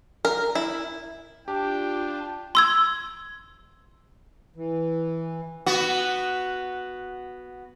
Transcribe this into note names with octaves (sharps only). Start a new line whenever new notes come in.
A#4
E4
D4 F4 G4 G5
C6 E6 G#6
E3
B3 F#4